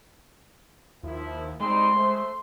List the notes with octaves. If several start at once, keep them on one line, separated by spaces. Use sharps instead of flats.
D#2 F3 E4
G3 G#3 C4 D#4 C6
A3 C5